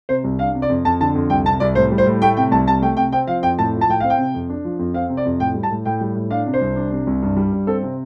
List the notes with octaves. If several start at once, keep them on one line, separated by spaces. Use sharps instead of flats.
C3 C5
C2
D4 F5
C3
D5
F2
F2 A5
D3 A5
F2
C2 G5
C3 A5
C2 D5
A2 C5
G3
C5
A2
A3 G5
C3 G5
C2 A5
C3 A5
A3 G5
C3 G5
C4 G5
F3 F5
F2 G5
A2 A5
F3
A5
A2 G5
C4 F5
G5
C3
F2
D4
F3
F2
C4 F5
C3
D5
F2
A2 G5
G3
A5
A2
A2 G5
G3
A2
D4 F5
C3
C5
C2
D4
C3
C2
G2
G3
G2
C4 A4
C3